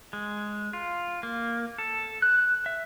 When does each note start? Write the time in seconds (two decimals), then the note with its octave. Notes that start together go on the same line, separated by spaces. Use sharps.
0.13 G#3
0.73 F4
1.23 A#3
1.78 A4
2.22 F#6
2.66 E5